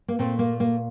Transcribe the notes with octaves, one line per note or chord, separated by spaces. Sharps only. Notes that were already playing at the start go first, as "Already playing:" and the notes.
A#3
A#2 A3 C4
A#3
A#3